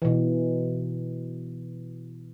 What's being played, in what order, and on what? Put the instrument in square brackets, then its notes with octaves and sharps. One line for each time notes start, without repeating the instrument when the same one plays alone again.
[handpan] B2 E3